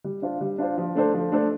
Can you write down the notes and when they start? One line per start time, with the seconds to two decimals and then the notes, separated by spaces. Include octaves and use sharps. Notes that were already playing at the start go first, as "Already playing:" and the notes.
0.04 G3
0.22 D4 F4 C5
0.41 G3
0.58 D4 F4 C5
0.78 F3
0.95 A3 D4 A4 C5
1.14 F3
1.32 A3 D4 A4 C5